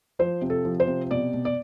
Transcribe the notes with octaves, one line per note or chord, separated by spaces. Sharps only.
F3 C5
C3
A4
F3
C5
C3
B2 D5
B2
D5